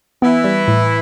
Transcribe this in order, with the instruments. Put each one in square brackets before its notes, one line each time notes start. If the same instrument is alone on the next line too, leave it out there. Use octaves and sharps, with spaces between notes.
[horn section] E3 E4 [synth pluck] B3
[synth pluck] G3
A2